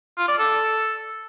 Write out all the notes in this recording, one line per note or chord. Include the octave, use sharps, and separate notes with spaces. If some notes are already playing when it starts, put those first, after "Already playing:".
F4
D5
A4